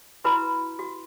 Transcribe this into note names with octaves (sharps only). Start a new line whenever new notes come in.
E4 F#4 B4 A#5 B5
F#4